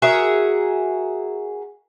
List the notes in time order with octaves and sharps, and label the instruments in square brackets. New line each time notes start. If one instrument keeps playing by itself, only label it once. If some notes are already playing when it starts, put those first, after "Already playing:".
[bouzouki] F#4 G#4 A#4 E5